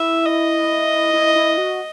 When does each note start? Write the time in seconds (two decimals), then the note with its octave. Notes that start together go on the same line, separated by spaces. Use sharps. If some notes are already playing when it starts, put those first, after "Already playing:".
Already playing: E4 E5
0.25 D#5
1.13 E4
1.36 E4
1.58 F#4